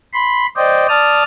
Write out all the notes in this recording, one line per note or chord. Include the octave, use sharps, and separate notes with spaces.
B5 C6
C5 D5 D#5 G5
D5 A5 D#6 F6